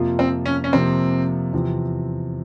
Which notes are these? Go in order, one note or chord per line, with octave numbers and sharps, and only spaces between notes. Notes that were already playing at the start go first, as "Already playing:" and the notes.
Already playing: F2 C3 F3 A#3 F4
C4
C#4
C#4
F2 C3 F3 A#3 C4
E2 C3 F3 C4